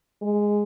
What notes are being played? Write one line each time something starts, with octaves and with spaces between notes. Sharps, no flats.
G#3